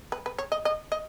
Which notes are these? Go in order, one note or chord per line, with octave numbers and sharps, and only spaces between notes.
B4
B4
C#5
D#5
D#5
D#5